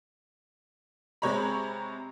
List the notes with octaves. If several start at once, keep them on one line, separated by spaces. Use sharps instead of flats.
C3 G#3 C#5 A#5 B5